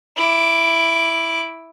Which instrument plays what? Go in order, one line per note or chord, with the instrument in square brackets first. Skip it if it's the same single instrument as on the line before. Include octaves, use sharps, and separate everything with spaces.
[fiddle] E4 D6